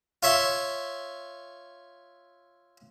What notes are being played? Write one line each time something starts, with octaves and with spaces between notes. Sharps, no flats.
F4 C#5 E5 C6